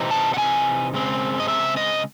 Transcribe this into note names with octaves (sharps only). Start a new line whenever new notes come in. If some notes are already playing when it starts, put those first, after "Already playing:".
Already playing: C3 E3 C4 D#4
A5
F#5
G#5
C#3 G#3 C4
D#5
E5
D#5